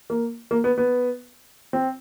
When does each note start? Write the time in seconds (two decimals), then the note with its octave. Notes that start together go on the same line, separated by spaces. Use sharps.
0.10 A#3
0.51 A#3
0.64 B3
0.78 B3
1.73 C4